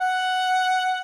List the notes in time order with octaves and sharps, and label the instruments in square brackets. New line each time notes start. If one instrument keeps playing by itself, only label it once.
[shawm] F#5